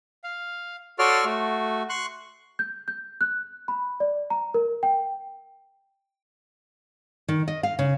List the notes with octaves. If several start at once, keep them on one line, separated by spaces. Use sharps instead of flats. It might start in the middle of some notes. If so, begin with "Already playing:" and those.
F5
F#4 A4 C#5 D5 C6 F6
A3 F#4
C6 C#6 F#6
G6
G6
F#6
B5
D5
A#5
A#4
G5
D#3
D#5
F5
C#3